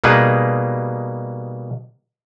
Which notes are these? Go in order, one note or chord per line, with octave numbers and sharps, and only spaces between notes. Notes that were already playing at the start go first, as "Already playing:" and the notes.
B2 G3 A#3 D#4 G#4 B4